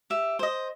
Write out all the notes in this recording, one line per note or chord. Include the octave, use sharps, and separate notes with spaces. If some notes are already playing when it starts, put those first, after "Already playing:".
G4 E5
C5 D#5